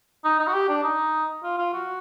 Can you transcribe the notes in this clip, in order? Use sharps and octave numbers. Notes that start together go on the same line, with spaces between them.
D#4
D#4
F#4
G4
D4
D#4
F4
F4
F#4